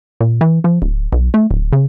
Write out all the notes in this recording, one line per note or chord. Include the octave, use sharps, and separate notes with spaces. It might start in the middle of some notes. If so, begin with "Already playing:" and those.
A#2
E3
F3
D1
B1
A3
D1
C#3